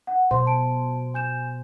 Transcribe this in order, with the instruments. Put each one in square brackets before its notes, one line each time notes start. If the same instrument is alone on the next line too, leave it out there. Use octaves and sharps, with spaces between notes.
[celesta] F#5
[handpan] B2 C5 [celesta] C6
[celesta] A5 D7
G#5 G6 E7